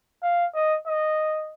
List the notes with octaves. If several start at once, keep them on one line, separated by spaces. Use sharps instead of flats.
F5
D#5
D#5